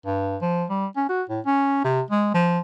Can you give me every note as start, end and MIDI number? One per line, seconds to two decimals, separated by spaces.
0.06 0.36 43
0.42 0.65 53
0.69 0.86 55
0.96 1.05 61
1.09 1.23 66
1.29 1.40 45
1.46 1.80 61
1.84 2.01 48
2.10 2.31 56
2.34 2.59 53